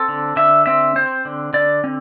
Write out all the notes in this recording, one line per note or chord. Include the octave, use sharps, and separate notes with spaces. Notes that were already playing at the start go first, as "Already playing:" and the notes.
Already playing: C4 A4
D3
D3 E5
C4 E5
C4 C5
D3
D3 D5
C4